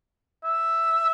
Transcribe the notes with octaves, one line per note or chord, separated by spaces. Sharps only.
E5